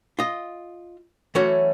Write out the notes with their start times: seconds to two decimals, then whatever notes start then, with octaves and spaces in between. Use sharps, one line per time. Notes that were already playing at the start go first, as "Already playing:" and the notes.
0.19 F4 D#5
1.35 E3 F#3 A3 C#4 F#4